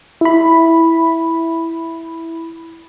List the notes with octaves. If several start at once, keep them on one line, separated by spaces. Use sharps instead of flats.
E4 B5